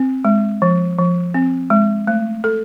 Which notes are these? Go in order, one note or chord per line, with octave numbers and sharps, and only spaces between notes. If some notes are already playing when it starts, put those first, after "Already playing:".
Already playing: C4
G#3
F3
F3
C4
G#3
A3
A4